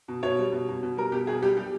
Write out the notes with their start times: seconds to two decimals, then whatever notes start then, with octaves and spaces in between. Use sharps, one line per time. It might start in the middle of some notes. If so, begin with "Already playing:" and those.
0.08 B2
0.23 B2 C#5
0.38 G3
0.52 B2
0.68 B2
0.83 B2
0.97 G3 A#4
1.12 B2 G4
1.27 B2 G#4
1.42 G3 G4
1.57 G3 G4